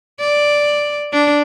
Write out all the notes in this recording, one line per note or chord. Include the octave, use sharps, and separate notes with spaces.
D5
D4